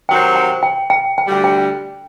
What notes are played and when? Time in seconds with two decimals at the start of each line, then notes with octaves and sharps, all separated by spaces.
0.09 C3 D#3 F#3 C4 D#4 G5
0.36 G5
0.63 G5
0.90 G5
1.18 G5
1.27 D2 D3 G3
1.44 G5